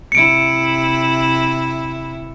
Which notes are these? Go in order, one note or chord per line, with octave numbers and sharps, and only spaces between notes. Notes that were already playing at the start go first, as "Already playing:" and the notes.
C3 E4 C#7 D7